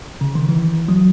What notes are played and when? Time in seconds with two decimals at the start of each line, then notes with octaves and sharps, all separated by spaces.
0.21 C#3
0.35 D#3
0.49 E3
0.89 F#3